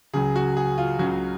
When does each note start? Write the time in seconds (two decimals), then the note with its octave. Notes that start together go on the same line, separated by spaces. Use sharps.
0.13 C#2 C#3 F#3 G#4
0.36 F#4
0.57 G#4
0.78 F4
0.99 C#2 C#3 F#3 F#4